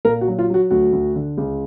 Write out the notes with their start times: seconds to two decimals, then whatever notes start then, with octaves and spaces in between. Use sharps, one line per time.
0.05 A#2 A#4
0.21 F#4
0.28 F#3
0.39 F4
0.50 F#3 F#4
0.71 D2 F#4
0.93 D2
1.16 D3
1.37 C#2